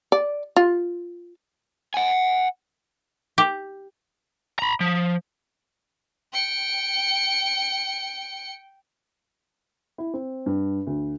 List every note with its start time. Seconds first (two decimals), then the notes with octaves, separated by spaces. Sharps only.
0.12 D5
0.56 F4
1.94 F#5 G#5
3.38 G4
4.59 A#5 B5
4.80 F3
6.33 G5 C#7
9.98 E4
10.14 C4
10.46 G2
10.87 D2